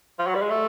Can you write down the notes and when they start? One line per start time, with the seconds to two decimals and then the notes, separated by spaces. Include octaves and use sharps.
0.19 F3
0.27 F#3
0.35 G3
0.42 G#3
0.50 A3